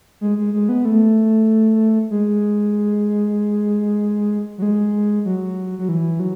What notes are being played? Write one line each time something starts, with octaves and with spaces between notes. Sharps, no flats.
G#3
G#3
G#3
B3
A3
G#3
F#3
G#3
F#3
F#3
E3
F#3